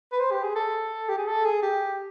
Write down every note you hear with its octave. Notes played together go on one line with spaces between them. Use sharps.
B4
C5
G4
G#4
A4
G4
G#4
A4
G#4
G4